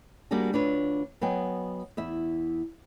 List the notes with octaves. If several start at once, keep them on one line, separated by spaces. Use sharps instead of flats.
G3 A#3 D4 F#4 G#4
D2 D4 F4 B4 C#5
F#3 B3 D#5 G5 G#5
E2 E4 E5